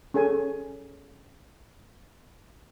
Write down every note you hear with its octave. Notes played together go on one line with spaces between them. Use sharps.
C#4 G#4 A4 G#5